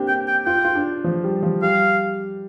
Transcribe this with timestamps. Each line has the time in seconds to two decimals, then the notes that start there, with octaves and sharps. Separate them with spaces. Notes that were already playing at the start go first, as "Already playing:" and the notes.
Already playing: A#3 C4 D4 G4
0.08 G5
0.28 G5
0.46 F4 G5
0.65 F4
0.75 D4
1.04 F3
1.24 G3
1.43 F3
1.62 G3 F5